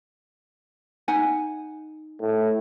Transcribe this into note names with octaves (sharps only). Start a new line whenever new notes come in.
D#4 F#5 G#5
A2